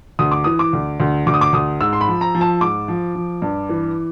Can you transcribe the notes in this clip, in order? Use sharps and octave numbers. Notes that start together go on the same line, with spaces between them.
D2 D#6
D6
E3 D#6
D6
D2
D2
D2 D6
D#6
D6
D2 D#6
G#2 E6
C6
B5
F3
A#5
F3
A5
G#2 D6
F3
F3
G2
E3